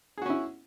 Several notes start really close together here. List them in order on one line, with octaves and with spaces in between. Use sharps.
G#4 F#4 C#4 E4